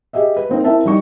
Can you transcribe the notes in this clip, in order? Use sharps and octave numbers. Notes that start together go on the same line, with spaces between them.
G4 G#4 D#5 E5
B4
A#3 C4 D#4
C4 E4 A#4 E5 A5
G3 D#4 C#6